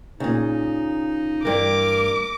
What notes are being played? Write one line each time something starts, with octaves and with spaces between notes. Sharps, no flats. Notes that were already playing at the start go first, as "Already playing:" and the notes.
A#2 C#3 D#4
G2 E3 A#4 D6